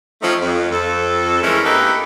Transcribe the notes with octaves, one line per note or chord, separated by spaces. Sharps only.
F3 A3 C4 C#4 D#4 F4
F2
F2 A4
E3 G#3 A3 C#4 E4 A#4
A#3 D4 D#4 G4 A4 B4